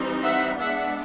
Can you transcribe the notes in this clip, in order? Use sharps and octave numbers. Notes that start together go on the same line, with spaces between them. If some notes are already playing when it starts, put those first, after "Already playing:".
Already playing: E3 G3 C4 D#4
E5 F#5
G#3 B3 D4 E5 F#5